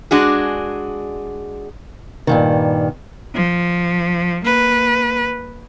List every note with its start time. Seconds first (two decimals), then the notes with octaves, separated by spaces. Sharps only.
0.11 G#3 D4 F#4 G#4
2.27 G2 A#2 D#3
3.35 F3
4.45 A#3 B4